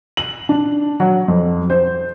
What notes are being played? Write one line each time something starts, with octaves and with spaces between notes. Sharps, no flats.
F#7
D4
F#3
F2
C5